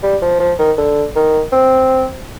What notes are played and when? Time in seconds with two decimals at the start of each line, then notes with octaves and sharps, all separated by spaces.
0.03 G3
0.22 F3
0.40 F3
0.59 D#3
0.78 D3
1.15 D#3
1.52 C4